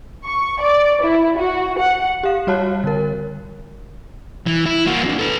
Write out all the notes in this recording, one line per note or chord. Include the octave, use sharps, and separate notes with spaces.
C#6
D5
E4
F#4
F#5
G4 F5
G3 F#4 C#5 A5 F#6
D3 A#4
E3
E4
A#3 F#4
F2 D3
A4 B4